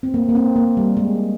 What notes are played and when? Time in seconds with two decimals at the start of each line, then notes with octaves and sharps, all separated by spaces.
0.03 C4
0.14 A#3
0.29 A#3
0.35 C4
0.56 A#3
0.77 G3
0.97 G#3